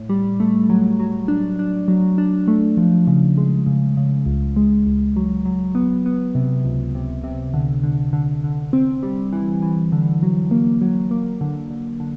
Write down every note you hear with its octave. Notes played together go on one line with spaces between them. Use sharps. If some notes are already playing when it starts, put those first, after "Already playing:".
Already playing: A2
G3
A3
F#3
F#3
D4
D4
F#3
D4
A3
F3
C#3
G#3
C#3
C#3
C#2
G#3
C#2
F#3
F#3
B3
B3
C3
C#2
C3
C3
D3
D3
D3
D3
C4
G3
E3
E3
D3
F#3
A#3
F#3
A#3
D3
D3
D3